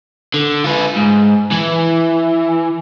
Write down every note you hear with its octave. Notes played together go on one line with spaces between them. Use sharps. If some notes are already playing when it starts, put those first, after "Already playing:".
D3
F4 B4
G#2
E3